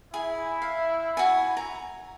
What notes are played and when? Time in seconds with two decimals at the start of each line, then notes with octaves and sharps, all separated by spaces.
0.14 E4 G#4
0.62 F5
1.17 F#4 G#5
1.57 A#5